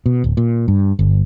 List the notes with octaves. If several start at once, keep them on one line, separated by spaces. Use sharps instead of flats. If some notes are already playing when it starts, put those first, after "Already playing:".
B2
D1
A#2
G2
G1